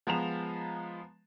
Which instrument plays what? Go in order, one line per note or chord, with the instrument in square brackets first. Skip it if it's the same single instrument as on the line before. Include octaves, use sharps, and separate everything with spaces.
[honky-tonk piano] F3 G#3 B3 A#5 E7 F7